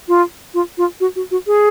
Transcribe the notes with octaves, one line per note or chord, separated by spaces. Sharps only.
F4
F4
F4
F#4
F#4
F#4
G#4